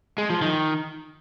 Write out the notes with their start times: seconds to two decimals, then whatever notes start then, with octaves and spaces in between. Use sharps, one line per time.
0.18 G#3
0.30 F3
0.42 D#3